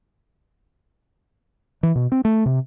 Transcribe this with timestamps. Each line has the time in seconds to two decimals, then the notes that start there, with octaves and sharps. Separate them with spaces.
1.83 E3
1.95 B2
2.12 C4
2.25 A3
2.46 C3